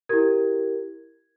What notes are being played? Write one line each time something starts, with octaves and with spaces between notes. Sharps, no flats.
E4 G4 A#4 G#6